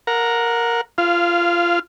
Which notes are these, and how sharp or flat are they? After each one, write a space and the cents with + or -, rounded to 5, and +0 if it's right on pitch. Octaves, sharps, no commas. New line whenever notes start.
A#4 +0 F#5 -25 A#5 +0
F4 -20 F5 +0